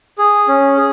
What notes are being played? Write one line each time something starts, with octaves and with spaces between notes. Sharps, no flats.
G#4
C#4
G#4